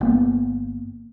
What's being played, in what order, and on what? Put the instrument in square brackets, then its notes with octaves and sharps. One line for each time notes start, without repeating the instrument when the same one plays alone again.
[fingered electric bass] G1 A#3 B3